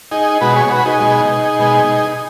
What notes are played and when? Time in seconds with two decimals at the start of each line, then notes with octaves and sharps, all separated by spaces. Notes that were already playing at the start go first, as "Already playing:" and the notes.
0.11 D#4 G#4
0.41 B2 G#3 F#4 B4
0.56 G#4 C#5
0.70 F#4 B4
0.86 D#4 G#4
1.00 B2 G#3
1.59 B2 G#3